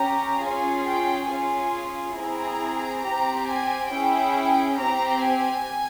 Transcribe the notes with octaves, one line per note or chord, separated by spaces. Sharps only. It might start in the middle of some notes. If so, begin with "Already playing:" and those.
Already playing: C#4 G4 A#5
C#4 F4 G#4 G#5
G5
C#4 F4 G#4 G#5
C4 E4 G#4 A#5
C4 G4 A#5
G#5
C#4 E4 G#4 G5
C4 G4 A#5
G#5